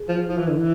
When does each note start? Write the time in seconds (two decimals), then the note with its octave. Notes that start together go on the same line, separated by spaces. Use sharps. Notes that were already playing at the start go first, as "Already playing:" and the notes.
Already playing: G#4
0.09 F3
0.28 F3 E4
0.38 E3
0.48 D3
0.57 E3